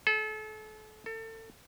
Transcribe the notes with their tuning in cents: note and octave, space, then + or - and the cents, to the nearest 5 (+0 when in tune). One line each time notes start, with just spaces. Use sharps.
A4 -35
A4 +30